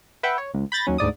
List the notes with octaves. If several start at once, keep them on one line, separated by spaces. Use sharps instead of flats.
B4 E5 F#5 G5
C#5
C#2
B5 G6 A6 A#6
D#2 F#3 C#4
D2 G#2 D5 D#6